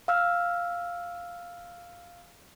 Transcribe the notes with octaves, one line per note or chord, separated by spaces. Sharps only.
F5 E6 F6